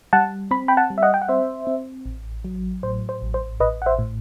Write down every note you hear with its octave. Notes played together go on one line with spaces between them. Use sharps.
G3 F#5 A5
C4 B5
G5 B5
F#5 A5
G3
E5
D#5 F#5
G5
F#5
C4 C5 E5
C4
A1
F#3
A2 C5
C5
A1
C5
A1 B4 D#5
F#5
C5 E5
A2